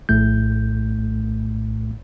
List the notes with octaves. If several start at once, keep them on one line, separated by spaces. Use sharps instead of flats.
A#1 A2 A3 G6